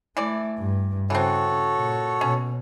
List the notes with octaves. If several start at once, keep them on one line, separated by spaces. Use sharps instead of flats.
E3 A3 E4 D5
G2
C#3 E3 C4 F#4 A4 C#5
A#2
B2 C#4